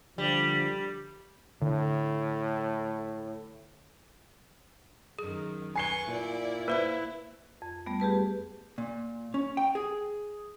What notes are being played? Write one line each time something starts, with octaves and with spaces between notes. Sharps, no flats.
D3 F3 G3
A2 D3
F#2 D#3 G#4
B4 G#5 C#6 C7 G7
A#2 E4 D5
A#3 E4 B4 C5 E5 B5
F2
G3 A3 B3
G4 G#4 B4 A5
A#2
C#4
G5
G#4